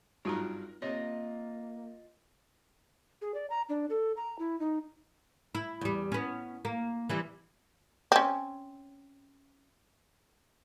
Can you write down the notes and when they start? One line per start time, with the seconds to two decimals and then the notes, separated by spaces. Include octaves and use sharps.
0.25 G#1 G2 F#3 D#4 F4 A#4 A#5
0.82 C3 A#3 F4 C#5 D#5
3.22 G#4
3.34 D5
3.50 A#5
3.69 D4
3.90 A4
4.17 A#5
4.39 E4
4.60 D#4
5.55 E4
5.81 E2 G3
6.12 B3 C#4
6.65 A#3
7.09 E3 G3 C4
8.12 C4 C#4